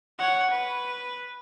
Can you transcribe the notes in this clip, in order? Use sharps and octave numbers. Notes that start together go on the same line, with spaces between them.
C#5 F#5
B4